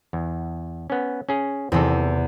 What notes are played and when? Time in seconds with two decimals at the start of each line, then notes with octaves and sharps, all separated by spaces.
0.13 E2
0.90 B3 C#4
1.29 C#4 G#4
1.72 E2 C3 C4 G#4 A4